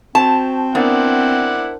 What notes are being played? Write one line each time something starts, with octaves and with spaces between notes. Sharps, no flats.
C4 F#4 C5 A5
B3 D4 E4 A#4 C5 D5 F#5